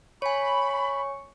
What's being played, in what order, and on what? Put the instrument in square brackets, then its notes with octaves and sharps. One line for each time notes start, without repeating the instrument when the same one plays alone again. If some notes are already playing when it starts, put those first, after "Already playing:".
[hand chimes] C#5 G#5 [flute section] B5 [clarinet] C#6